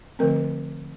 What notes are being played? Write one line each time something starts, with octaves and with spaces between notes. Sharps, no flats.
D3 F3 A3 C4 A#4